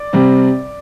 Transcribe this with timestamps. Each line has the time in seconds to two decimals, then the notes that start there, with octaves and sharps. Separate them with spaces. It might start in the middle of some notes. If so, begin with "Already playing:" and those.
Already playing: D5 D6
0.13 C3 G3 C4